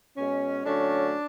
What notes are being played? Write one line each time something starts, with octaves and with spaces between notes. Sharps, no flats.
B2 G#3 C#4
D3 F#3 A3 C#4 D4